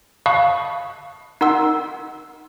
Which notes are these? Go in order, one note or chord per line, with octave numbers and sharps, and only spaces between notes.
F5 A5 B5 C#6 D#6 F#6
D#4 A#4 F#5 C6 E6